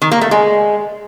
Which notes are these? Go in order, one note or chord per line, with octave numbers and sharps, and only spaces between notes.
D#3
A#3
A3
G#3